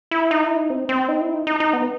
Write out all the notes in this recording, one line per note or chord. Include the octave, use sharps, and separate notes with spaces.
E4
D#4
E4
D#4
C4
C4
D#4
E4
D#4
D#4
D#4
B3